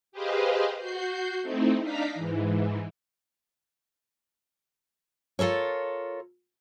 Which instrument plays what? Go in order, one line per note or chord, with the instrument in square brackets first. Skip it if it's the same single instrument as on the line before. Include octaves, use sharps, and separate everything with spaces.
[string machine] G4 G#4 B4 C5 D#5 F5
F#4 G6 C7
A3 C4 D#4 E4
D4 D#4 F5 A#5 B6
G#2 E3
[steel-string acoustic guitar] F4 A4 A#4 C#5